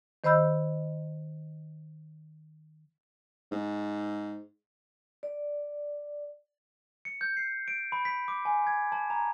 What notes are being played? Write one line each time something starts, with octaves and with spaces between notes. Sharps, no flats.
D#3 C5 D#5 B5 E6 G6
G#2
D5
C#7
G6
C7
D7
B5
B6
D6
G#5
G#6
A5
A#5